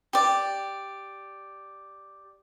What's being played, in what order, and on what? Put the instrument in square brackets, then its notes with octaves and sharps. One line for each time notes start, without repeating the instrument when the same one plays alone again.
[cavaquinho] G4 D5